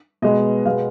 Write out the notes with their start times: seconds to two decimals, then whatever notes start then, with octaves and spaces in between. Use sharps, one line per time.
0.22 B2 G#3 B3 D#5
0.66 B2 G#3 B3 F5